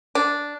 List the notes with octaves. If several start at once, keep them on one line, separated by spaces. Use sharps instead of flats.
D4